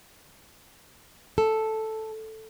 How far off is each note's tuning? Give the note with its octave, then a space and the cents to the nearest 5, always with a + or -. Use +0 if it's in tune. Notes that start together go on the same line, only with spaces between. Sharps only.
A4 +0